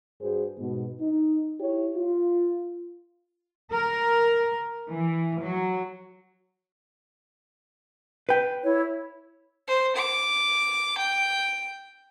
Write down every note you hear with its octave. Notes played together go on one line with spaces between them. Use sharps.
G2 D4 F#4 G#4 B4 C5
G#2 B2
D#4
E4 G4 C#5
F4
A#4
E3
F#3
B4 G5
E4 C#5
C5
D6
G5